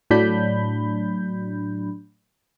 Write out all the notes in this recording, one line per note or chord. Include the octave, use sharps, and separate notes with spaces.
A2 F#3 D4 B5 G6